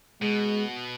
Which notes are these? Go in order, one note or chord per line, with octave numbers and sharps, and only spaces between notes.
B2 G#3